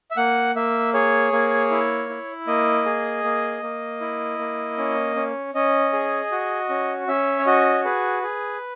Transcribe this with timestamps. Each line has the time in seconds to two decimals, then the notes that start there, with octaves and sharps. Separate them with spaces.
0.11 E5
0.17 A#3 F#5
0.55 A#3 E5
0.94 G#4 C#5
1.32 A#3
1.71 E4
2.09 E4
2.47 A#3 D#5
2.85 G#4
3.24 A#3
3.63 A#3
4.01 E4
4.39 A#3
4.78 C#4
5.16 C#4
5.55 C#4 D#5
5.93 G#4
6.31 F#4
6.69 C#4
7.08 C#4 E5
7.39 C#5
7.46 F#4 D#5
7.85 G#4 B4
8.23 G#4